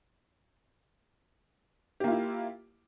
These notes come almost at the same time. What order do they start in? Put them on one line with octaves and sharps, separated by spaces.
G4 A#3 F4 E4